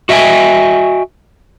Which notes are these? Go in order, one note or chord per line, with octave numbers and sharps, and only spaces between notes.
F#4 D#5 E5 G5 G#5